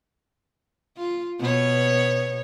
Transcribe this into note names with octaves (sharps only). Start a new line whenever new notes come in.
F4
B2 B3 C#5